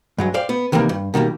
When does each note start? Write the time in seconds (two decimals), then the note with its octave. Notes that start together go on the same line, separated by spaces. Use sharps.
0.18 G2 F#3 G#3
0.34 C5 D5 F5 G5
0.49 B3
0.72 C3 D#3 E3 G3 A#3
0.89 G2
1.14 B2 D#3 G3 A#3